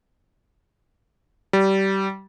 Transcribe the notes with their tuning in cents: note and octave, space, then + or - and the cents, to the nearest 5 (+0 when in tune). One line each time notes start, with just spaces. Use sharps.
G3 -20